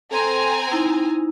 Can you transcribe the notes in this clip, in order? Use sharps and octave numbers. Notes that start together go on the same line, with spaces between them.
C4 A4 G#5 A#5 C6
D#4 E4